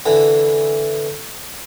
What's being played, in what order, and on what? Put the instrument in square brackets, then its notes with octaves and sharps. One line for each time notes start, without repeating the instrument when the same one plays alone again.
[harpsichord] D3 E3